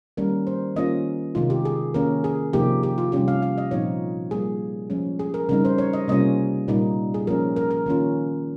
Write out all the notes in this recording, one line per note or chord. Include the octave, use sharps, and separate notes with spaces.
D#3 G3 A#3 C#4 A#4
C5
D#3 A#3 C#4 F4 D#5
C3 D#3 G#3 D#4 F4
G4
G#4
D#3 A#3 C#4 A#4
G#4
C3 F3 A#3 D#4 G4
G4
F4
C3 G3 C#4 F4 G4
F5
F5
D#5
A#2 F3 C4 D#4 C#5
G3 A#3 F4 G#4
F3 G#3 C#4
G#4
A#4
C#3 G3 C4 D#4 A#4
C5
C#5
D#5
C3 G3 A#3 C#4 F4 D#5
A#2 G3 A#3 D#4
G#4
F3 A#3 C#4 A#4
A#4
A#4
D#3 A#3 C#4 F4